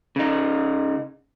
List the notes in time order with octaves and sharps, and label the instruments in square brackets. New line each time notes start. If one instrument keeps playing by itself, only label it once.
[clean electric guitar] C#3 D#4